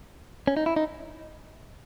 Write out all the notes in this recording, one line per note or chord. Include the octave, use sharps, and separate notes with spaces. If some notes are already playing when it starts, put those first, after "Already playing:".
C#4
D#4
E4
D#4